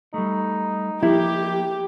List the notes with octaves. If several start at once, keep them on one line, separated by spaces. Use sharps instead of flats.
G3 A3 D#4
F3 A#3 E4 G4